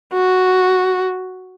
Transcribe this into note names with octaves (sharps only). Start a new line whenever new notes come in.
F#4